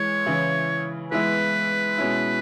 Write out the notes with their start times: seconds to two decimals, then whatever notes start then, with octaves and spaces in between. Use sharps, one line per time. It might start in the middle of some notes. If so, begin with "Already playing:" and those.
Already playing: E3 G#3 E4 C#5
0.26 C#3 E3 C#4 E4
1.12 E3 G#3 B3 E4 B4
1.98 B2 G#3 C#4 E4